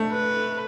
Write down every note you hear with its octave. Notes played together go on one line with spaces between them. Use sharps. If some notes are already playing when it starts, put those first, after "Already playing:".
Already playing: A3
B4